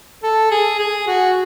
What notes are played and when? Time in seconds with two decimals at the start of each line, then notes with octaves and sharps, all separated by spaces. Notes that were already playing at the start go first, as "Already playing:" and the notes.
0.23 A4
0.51 G#4
0.79 G#4
1.07 F#4